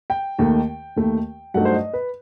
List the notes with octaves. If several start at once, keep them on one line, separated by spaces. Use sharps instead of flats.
G5
D#2 D#3 A3
D#2 D#3 A3
G2 F#3 A3 D#4 F#5
C5
D#5
B4